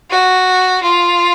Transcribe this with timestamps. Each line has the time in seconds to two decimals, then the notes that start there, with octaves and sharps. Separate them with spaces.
0.10 F#4
0.83 F4